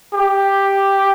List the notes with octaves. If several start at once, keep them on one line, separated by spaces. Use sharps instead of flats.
G4